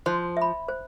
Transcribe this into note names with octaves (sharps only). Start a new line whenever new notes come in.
F3 C5
E5 B5
C5